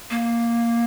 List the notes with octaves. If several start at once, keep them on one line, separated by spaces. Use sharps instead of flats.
A#3